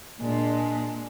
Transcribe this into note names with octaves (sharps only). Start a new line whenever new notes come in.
A#2 G#3 D4